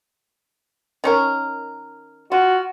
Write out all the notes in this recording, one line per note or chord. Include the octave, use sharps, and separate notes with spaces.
D#3 C#4 A#4
F4 F#4